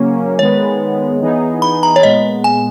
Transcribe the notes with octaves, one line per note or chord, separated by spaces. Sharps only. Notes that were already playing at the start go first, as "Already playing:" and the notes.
Already playing: C#3 F#3 A#3 C#4
D#3 G#3 B3 C#5
E3 B3 D#4 G#4
B5
A#5
C#5
A#2 G#3 B3 D#5
G#5